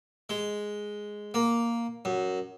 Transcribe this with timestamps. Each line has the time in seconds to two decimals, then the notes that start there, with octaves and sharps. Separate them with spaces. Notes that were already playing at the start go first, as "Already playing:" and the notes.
0.30 G#3
1.34 A#3
2.05 F#2